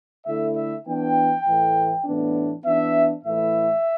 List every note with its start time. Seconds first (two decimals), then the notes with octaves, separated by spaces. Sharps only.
0.26 D3 A3 E4 E5
0.56 E5
0.86 E3 B3 D4 G5
1.46 A2 E3 A3
2.05 A2 E3 B3 D4
2.65 E3 B3 D4 E5
3.23 A2 E3 A3 E4 E5